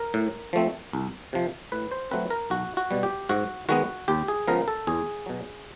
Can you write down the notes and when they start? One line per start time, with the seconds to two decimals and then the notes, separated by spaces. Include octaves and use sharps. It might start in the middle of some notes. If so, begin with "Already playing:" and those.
Already playing: A#4
0.14 A2
0.53 F3 A3 C4
0.93 C2
1.33 C3 F3
1.72 A2 B4
1.91 C5
2.11 F#3 A3 C4 B4
2.30 A#4
2.50 B1 F#4
2.77 F#4
2.91 B2 G3
3.03 G4
3.29 G#2 F#4
3.69 D#3 G#3 B3 F#4
4.08 D#2 G4
4.28 G#4
4.47 C#3 F3 G#3 B3 A#4
4.68 A4
4.87 E2 G#4
5.26 B2 F#3